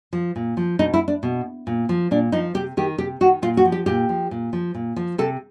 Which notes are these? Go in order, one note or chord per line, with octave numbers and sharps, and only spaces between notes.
F3
A#2
F3
B2 D#4
E4
D4
B2
A#2
F3
A#2 D4
F3 D#4
C3 G4
D#3 G4
C3 G4
D#3 F#4
A#2 F4
F#4
F3
G4
A#2 G4
F3
A#2
F3
A#2
F3
C3 A4